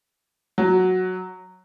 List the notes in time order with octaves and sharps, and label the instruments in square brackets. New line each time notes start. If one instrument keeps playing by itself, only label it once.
[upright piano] F#3